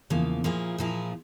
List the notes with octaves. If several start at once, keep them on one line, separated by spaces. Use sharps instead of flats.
E2 C#3 F3 A#3
A#2 F3 A#3 E4 G#4
A#2 F3 A#3 E4 G#4